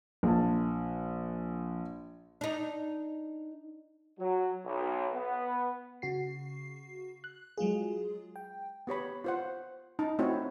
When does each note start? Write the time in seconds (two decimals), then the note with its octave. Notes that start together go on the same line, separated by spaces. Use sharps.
0.23 A#1 A5
2.41 D4 D#4
4.19 F#3
4.65 B1
5.14 B3
6.02 C#3 F#4 C7
7.24 F#6
7.58 F#3 G#3 F4 G#4
8.36 G5
8.87 B3 G4 C#5 B5
9.24 F4 C5 F#5
9.99 C#4 D#4 A5
10.19 A3 C4 E4 F#4 C5 C#5